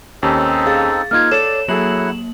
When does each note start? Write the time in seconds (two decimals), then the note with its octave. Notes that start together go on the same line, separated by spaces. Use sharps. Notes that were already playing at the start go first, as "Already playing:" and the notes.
0.23 D#2 C4 C#4 D#4 G4 A4
0.66 G#4 F5 A6
1.11 A#3 D#4 F4 F6 G#6
1.31 A4 C#5 D5 E7
1.68 F#3 A#3 E4 G#4 A4 F#5 F#7